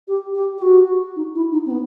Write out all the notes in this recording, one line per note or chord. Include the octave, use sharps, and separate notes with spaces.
G4
G4
G4
F#4
D#4
E4
D#4
C4
B3